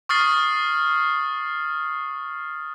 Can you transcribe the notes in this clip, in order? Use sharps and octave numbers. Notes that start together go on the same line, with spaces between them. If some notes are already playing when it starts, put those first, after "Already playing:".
C#6 D#6 F6 A6 C7